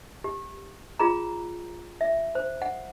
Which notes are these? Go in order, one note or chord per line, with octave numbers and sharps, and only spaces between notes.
G4
F4 G#4 A#5
E5
C5
F#5